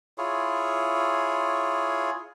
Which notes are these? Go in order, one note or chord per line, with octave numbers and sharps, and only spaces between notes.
E4 F4 G#4 C#5